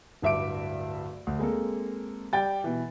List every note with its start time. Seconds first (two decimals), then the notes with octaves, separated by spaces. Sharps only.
0.22 D1 G2 E5 D6 D7
1.27 D2
1.39 G#3 A#3 C4 A4
2.33 G3 G5 A6
2.64 B2 E3